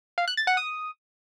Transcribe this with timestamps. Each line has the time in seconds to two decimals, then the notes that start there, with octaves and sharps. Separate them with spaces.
0.18 F5
0.28 F#6
0.37 A6
0.47 F#5
0.57 D#6